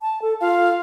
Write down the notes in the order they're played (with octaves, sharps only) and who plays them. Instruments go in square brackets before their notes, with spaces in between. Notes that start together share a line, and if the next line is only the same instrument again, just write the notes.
[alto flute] A5
A4
[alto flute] F4 [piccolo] F5